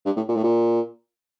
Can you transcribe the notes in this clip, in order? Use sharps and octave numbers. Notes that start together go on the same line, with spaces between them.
G2
A2
A#2
A2
A#2